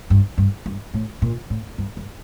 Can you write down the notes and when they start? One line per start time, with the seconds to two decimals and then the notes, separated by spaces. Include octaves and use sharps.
0.10 G2
0.38 G2
0.66 G2
0.94 A2
1.22 A#2
1.50 A2
1.78 G2
1.97 G2